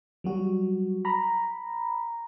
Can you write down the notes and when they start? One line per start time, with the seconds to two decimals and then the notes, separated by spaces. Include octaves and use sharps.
0.24 F#3 G3 F#4
1.05 A#5 B5